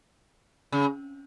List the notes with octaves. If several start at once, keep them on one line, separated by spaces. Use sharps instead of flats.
C#3